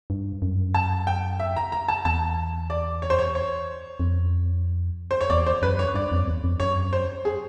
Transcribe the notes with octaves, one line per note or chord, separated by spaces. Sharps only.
G2
F#2
A5
G5
E5
A#5
A#5
A5
E2 A5
D5
C#5
C5
C#5
C#5
F2
C5
C#5
E2 D5
C5
F#2 B4
C#5
G2 D5
F2
E2
F2
F#2 C#5
C5
G#4